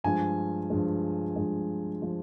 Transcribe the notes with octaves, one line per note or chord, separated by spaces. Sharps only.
G2 F3 G#3 G#5
G2 F3 G#3
G2 F3 G#3
F3 G#3